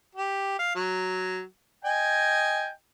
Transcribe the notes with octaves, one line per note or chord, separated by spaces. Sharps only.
G4
F5
F#3
D#5 G5 G#5